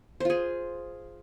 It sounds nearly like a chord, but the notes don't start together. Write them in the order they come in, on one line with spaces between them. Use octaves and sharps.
C5 F4 G#4